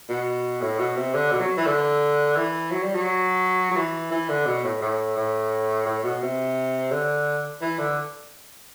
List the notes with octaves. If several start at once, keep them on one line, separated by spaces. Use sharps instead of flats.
B2
A2
B2
C3
D3
B2
F#3
E3
D3
E3
F#3
G3
F#3
F#3
E3
E3
D3
B2
A2
A2
A2
A2
B2
C3
D3
E3
D3